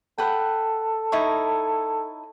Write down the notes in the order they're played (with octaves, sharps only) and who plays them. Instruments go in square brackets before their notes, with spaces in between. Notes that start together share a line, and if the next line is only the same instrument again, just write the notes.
[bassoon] A4 [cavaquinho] B4 F#5 G5
[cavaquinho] D#4 E4 C#5